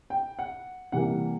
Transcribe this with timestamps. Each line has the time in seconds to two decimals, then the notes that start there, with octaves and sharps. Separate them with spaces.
0.10 G5
0.39 F#5
0.92 C3 E3 G3 A#3 F#5